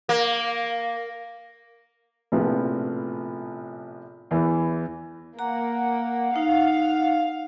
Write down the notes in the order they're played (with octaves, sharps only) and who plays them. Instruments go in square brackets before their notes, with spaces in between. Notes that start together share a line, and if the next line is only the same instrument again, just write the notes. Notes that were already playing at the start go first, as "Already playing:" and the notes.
[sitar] A#3
[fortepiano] A#1 A2 C3 F3 B3
E2 E3
[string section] A#3 [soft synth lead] F#5 [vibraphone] A#5
[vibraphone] D#4 [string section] F5